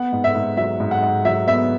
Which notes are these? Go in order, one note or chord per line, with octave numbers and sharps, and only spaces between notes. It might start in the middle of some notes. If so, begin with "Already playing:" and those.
Already playing: B3 F#5
G#2
E5
G#2
F#3 E5
G#2
F#5
G#2
F#3 E5
B3 E5